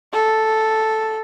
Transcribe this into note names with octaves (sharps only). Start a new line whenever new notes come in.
A4